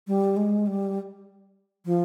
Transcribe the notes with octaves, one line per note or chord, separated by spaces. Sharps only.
G3
G#3
G3
F3